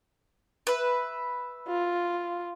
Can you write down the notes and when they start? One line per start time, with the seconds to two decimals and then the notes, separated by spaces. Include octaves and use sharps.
0.67 B4 E5
1.68 F4